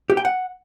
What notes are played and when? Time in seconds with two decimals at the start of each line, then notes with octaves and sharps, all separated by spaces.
0.10 G4
0.17 G5
0.25 F#5